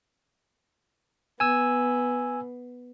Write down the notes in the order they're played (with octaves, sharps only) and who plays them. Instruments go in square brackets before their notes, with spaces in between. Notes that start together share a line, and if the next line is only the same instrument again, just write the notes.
[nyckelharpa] B3 [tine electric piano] G#5 E6